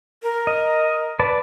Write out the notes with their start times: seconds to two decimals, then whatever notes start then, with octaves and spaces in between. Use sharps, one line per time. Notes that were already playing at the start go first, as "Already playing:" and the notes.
0.23 A#4
0.47 D#5
1.19 B4 D5 A5